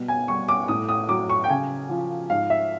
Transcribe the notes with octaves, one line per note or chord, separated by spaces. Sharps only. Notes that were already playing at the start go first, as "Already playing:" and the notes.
Already playing: B2 G3
G#5
G3 C#6
D6
A2 D#6
D#6
F#3 D6
C#6
G5
C#3 G#5
F3
G#2 F5
E5